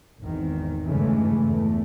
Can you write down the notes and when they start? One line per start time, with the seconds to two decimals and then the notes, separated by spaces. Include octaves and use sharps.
0.20 G#1 E2 D#3
0.86 G2 C#3 E3 G#3 A3
1.45 E2 A3